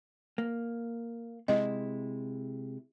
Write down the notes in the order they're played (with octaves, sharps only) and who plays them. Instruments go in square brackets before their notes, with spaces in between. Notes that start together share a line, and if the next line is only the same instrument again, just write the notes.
[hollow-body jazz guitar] A#3
[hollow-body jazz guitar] C3 G#3 E4 [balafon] D#5